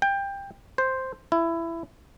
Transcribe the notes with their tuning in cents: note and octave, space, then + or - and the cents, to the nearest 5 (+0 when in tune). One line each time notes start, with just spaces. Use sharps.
G5 +20
C5 +0
E4 +15